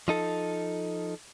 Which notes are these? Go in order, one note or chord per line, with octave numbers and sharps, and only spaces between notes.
F3 D#4 A4